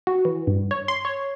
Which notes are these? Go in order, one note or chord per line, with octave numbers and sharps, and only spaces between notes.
F#4
E3
G2
C#5
C6
C#5